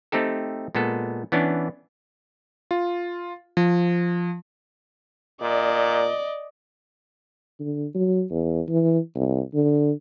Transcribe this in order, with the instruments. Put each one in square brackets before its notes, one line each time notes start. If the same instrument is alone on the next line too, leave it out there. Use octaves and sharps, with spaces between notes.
[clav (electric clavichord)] A3 C4 D#4 G4 A4
A#2 G#3 B3 A4
E3 B3 C#4 D4
[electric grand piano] F4
F3
[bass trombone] A#2 [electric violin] D5 D#5
[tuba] D3
F#3
E2
E3
C2
D3